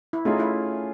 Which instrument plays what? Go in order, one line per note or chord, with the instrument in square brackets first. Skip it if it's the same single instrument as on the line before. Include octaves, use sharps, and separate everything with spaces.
[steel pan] E4
[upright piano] A3 C#4 F4 G#4 [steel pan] D#4
[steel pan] E4